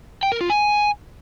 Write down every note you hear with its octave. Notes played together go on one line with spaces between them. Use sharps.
G5
A#4
F4
G#5